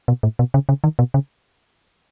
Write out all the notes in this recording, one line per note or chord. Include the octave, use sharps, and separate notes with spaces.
B2
A2
B2
C#3
C#3
D#3
B2
C#3